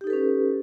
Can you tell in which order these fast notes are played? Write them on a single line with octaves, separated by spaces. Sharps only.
G4 D#4 A4 B4 C#4